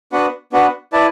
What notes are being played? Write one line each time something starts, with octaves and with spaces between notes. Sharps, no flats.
B3 D4 F#4 B4 F#5
B3 D4 F#4 B4 F#5
E4 B4 D5 A5